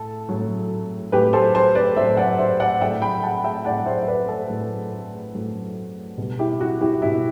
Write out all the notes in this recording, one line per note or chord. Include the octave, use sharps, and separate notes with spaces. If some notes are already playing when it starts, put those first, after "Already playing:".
Already playing: A2 A4
A2 F#3
A2 F#3 G4 B4
A4 C5
A4 C5
B4 D5
A2 F#3 C5 E5
D5 F#5
C5 E5
D5 F#5
A2 F#3 E5 G5
G5 B5
F#5 A5
E5 G5
A2 D5 F#5
F#3
C5 E5
E5
B4 D5
A4 C5
A2 F#3
A2 F#3
B2 G3
E4 G4
F#4
E4 G4
B2 G3 E4